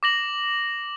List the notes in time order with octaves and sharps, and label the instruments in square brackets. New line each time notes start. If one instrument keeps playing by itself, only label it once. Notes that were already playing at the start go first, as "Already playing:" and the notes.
[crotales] D6 A#6 F#7